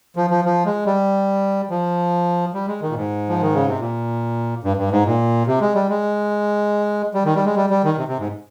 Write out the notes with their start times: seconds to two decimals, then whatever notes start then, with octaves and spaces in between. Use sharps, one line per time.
0.16 F3
0.30 F3
0.45 F3
0.65 G#3
0.86 G3
1.70 F3
2.54 G3
2.68 G#3
2.82 D#3
2.89 A#2
2.96 G#2
3.29 F3
3.41 D#3
3.54 C#3
3.67 C3
3.79 A#2
4.63 G2
4.77 G2
4.91 G#2
5.05 A#2
5.47 C3
5.61 G#3
5.75 G3
5.89 G#3
7.14 G3
7.25 D#3
7.36 G3
7.46 G#3
7.56 G3
7.70 G3
7.84 D#3
7.98 C3
8.08 C3
8.19 G#2